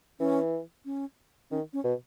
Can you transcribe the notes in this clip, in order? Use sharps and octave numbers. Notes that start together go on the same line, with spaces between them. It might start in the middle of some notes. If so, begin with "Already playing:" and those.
E3 C#4
C#4
D#3 C#4
C#4
B2